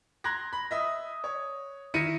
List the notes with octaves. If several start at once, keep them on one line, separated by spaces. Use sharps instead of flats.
A#5 C6 F#6 G#6 A#6
B5
D#5 E5 D#6
C#5
D#3 E4 A#6 C#7 D#7